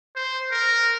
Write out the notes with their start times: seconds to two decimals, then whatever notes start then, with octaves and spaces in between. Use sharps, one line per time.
0.16 C5
0.51 A#4